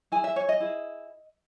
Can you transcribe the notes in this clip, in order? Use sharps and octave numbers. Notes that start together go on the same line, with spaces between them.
E4 G#4 G#5
E5
C#5
D#5
E4 G#4